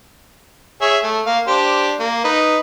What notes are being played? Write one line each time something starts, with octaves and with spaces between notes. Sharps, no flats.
G#4 C#5 E5
A3
A#3 F5
D4 G4 C5
A#3
D#4 B4